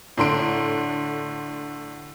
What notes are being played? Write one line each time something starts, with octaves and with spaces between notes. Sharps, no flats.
A2 D3 C6 D7